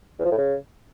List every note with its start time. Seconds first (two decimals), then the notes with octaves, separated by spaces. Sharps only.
0.19 E2
0.25 F3
0.32 A2
0.38 C#3